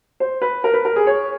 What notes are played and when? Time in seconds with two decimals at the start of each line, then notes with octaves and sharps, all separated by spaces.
0.20 C5
0.42 B4
0.64 A#4
0.74 B4
0.85 A#4
0.96 G#4
1.07 C#5